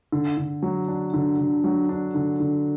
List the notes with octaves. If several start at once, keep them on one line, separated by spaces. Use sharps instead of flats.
D3
D3
F#3
D4
D3
D3
F#3
D4
D3
D3